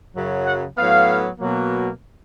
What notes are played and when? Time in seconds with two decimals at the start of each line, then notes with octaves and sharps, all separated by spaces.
0.15 F#2 C#3 F#3
0.47 F#5
0.78 A2 F#3 B3 F5
1.40 B2 F#3 A#3